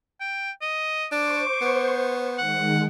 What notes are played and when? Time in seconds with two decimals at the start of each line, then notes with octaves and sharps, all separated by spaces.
0.20 G5
0.62 D#5
1.12 D4 C5 C#6 D6
1.61 B3
2.38 D#3 G#3 F#5